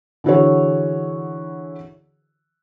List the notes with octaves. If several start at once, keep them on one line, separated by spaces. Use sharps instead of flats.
D3 E3 E4 F#4 G#4 C#5